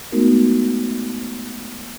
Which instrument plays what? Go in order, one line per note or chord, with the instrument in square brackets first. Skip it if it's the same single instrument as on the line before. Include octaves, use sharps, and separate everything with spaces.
[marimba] G#3 A3 B3 D#4 F#4 A#4